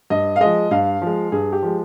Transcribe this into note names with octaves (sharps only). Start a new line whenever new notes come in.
G2 D#5
F5
F3 G#3 D#5
G2 F5
F3 G#3
G2 G#4
G4
F3 G#3